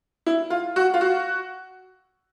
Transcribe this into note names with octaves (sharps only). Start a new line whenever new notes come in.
E4
F4
F#4
F4
F#4